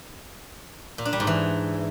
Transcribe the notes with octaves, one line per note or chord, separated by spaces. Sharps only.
A#2
D4
G3
G#2
E3